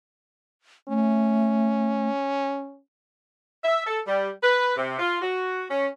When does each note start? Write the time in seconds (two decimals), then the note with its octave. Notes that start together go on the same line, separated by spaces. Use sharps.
0.89 A3 C#4
3.64 E5
3.87 A4
4.07 G3
4.43 B4
4.77 C3
4.99 F4
5.22 F#4
5.70 C#4